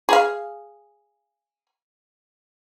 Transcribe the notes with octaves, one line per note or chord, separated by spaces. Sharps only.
G#4 F5